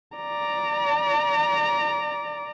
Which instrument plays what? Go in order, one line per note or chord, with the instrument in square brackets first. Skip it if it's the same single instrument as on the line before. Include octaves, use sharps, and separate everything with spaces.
[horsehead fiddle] D5 A#5